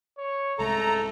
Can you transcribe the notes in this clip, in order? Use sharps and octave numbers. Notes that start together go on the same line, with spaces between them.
C#5
C2 G#2 G#3 A3 A4 A#5